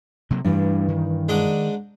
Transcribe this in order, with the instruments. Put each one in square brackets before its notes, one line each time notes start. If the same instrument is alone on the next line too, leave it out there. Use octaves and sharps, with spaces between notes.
[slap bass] C3 F#3 A#3
[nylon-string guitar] G2 E3 [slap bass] G3 A3 D4
[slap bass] D#3
[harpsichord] G#2 D4 D#5